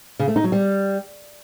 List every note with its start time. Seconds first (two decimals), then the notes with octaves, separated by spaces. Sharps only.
0.19 C#3
0.28 A3
0.36 D#4
0.44 F#3
0.52 G3